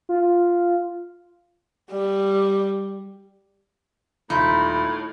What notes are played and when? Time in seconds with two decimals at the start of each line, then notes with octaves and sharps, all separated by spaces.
0.09 F4
1.91 G3
4.30 D#1 A2 D#4 B5 C6